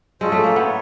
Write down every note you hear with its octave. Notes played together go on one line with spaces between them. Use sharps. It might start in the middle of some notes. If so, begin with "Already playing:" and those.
G#3 C#4 F4 A4 C5
A3
A#3
B3 E4 A4 C#5